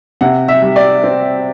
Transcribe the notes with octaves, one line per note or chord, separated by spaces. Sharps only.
C3 F#5
E5
G3
D5
C4